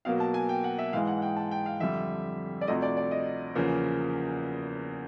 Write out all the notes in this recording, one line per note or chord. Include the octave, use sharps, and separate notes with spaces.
B2 F#3 A#3 F5
A5
G#5
G5
F#5
E5
G#2 E3 G#3 F5
F#5
G5
A5
G5
F5
F2 D3 G3 E5
D5
D2 C3 F3 A3 D#5
D5
D5
D#5
E2 C#3 F3 A#3